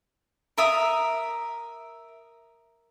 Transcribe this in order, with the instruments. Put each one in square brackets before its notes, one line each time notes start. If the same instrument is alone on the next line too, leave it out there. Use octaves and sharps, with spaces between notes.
[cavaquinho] A#4 E5 A#5 D#6